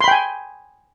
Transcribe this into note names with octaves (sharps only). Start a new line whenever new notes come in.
G5 G#5 B5 C6